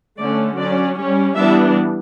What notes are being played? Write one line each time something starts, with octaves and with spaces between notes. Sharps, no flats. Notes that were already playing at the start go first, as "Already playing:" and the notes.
D3 A3 C#4 D5
F#3 C#4 D5
G3 C#4
E3 G3 B3 D4 E5